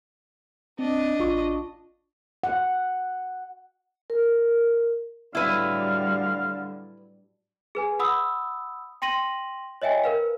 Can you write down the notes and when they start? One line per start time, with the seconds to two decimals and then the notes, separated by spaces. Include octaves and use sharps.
0.79 C4 D4 D#5
1.19 A1 F4 C#6
2.43 F#5
4.10 A#4
5.35 A2 D3 F#3 G3 E4 B4 F5
7.75 G#4 B4 G#5
7.99 F#5 B5 D#6 E6
9.02 G5 C6 A#6 D#7 F#7
9.82 C#5 D#5 E5 G5 G#5
10.04 A#4 B4 F5